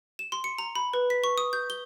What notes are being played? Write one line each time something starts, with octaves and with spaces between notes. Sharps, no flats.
E7
C6
C#7
A#5
B5
B4
B6
C#6
D#6
G6
G7